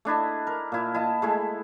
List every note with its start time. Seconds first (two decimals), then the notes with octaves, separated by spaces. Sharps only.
0.05 A3 D4 E4 D#5
0.47 A#4
0.72 A#2 E4
0.94 E4 D#5 A5
1.22 G#3 A3 E4